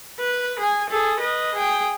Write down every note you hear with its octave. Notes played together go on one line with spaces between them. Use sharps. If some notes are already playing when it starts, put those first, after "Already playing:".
B4
G#4 G#5
G#4 A4
B4 D#5
G#4 G5